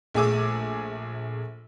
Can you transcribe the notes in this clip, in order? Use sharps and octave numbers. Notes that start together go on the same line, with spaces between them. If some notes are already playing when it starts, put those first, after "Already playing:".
A#1 A3 G#4 G#5 D6 E6